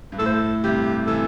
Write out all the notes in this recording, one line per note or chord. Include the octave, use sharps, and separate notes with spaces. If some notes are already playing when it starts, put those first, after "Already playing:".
G2
A2 A4
C5
A4
G2 C3 G4
C3 E3 A4